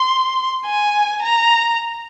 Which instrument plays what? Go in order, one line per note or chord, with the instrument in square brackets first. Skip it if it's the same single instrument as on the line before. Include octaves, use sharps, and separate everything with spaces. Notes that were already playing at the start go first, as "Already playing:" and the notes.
Already playing: [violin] C6
G#5
A#5